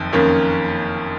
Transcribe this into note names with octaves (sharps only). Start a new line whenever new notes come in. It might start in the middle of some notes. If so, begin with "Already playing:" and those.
Already playing: F#1 F2 D#3
F#1 F2 D#3 A#3 C#4